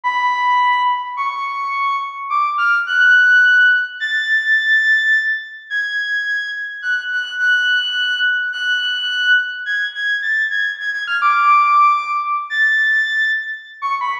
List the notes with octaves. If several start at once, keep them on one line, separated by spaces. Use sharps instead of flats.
B5
C#6
D6
F6
F#6
A6
G#6
F#6
F#6
F#6
F#6
G#6
G#6
A6
G#6
G#6
G#6
F6
D6
A6
C#6
B5